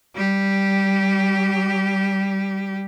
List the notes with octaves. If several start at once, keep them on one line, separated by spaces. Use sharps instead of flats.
G3 G4